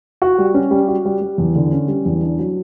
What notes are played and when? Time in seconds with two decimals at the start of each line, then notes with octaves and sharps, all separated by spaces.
0.22 F#4
0.38 G3
0.54 C#4
0.71 G3
0.88 F#4
1.05 G3
1.21 G3
1.38 E2
1.55 D3
1.72 C#4
1.88 G3
2.06 E2
2.22 D4
2.39 F#3